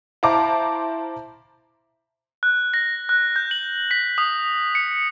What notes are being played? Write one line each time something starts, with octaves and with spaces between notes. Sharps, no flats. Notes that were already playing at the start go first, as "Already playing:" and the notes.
E4 C5 F5 A5 A#5 D6
F#6
A#6
F#6
G6
F#7
B6
D#6
C#7